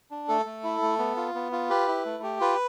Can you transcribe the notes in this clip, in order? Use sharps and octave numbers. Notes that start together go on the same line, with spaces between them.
D4
A3 A4
A3
E4
A3
B3
F4
B3
F4
G4 B4
E4
A3
G4
F4 B4